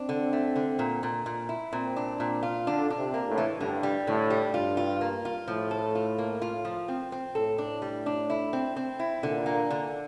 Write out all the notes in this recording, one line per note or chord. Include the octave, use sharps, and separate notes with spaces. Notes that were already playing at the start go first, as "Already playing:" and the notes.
Already playing: C4 D4
D3
A3
D3
A#2
A#2
A#2
E4
A#2 C4
D4
A#2
F4
D3 D4
D4
C3
A#3
A2
E3
G2 D3
G3
A2 D3
G3
G2 F4
F4
A#3
F4
A2 F3
A4
F4
A#3
F4
F3
C4
C4
A2 A4
D4
G3
D4
E4
C4
C4
E4
A#2 D3
A#3
D3